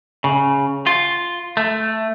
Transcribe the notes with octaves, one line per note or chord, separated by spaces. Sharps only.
C#3
F4
A3